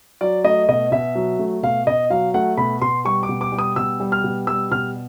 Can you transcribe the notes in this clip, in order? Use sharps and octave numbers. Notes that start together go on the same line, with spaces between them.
F#3 D5
A3 D#5
B2 D#5
B2 E5
F#3
A3
B2 F5
B2 D#5
F#3 F5
A3 F#5
B2 B5
B2 C6
G3 C#6
D6
B2
D6
G3
D#6
B2 E6
G3
F6
B2
G3 E6
B2 F6